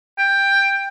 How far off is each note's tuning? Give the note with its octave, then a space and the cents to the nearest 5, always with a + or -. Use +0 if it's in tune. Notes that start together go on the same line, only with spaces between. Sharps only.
G5 +10